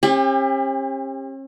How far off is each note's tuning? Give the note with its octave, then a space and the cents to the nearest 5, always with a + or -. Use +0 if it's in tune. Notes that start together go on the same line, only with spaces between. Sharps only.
C#4 -45 G4 +30